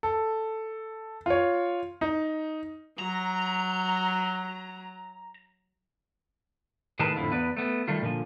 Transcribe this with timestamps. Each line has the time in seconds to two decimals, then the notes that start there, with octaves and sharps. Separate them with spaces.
0.03 A4
1.26 F4 C#5
2.01 D#4
2.99 F#3 A#5
6.99 A2 D#3 G#4 A#4 B4 A5
7.16 F2 A2 D3 E4 F4
7.31 E2 B3 B4 D5
7.57 A3 B3
7.88 D#3 G3 A3 F4
8.02 A#2 D3 E3 F3